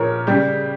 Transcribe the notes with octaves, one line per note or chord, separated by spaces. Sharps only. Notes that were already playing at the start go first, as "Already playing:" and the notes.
Already playing: A#2 F3 A#4 C#5
C#3 G3 G4